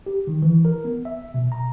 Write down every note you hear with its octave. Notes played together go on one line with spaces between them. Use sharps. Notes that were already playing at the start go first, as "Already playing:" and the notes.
G4
D#3
E3
A#4
B3
E5
B2
A#5